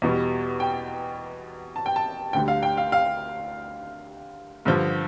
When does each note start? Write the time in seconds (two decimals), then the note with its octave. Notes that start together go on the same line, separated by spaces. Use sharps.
0.02 E2 B2 G3
0.60 G5
1.76 A5
1.86 G5
1.96 A5
2.33 D2 D3 G3 G5
2.48 F5
2.63 G5
2.77 F5
2.92 F5
4.65 G2 D3 F3